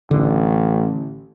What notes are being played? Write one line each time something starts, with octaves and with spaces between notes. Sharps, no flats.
A1 D3